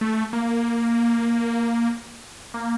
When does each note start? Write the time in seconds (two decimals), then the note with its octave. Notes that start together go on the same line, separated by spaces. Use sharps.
0.01 A3
0.33 A#3
2.54 A#3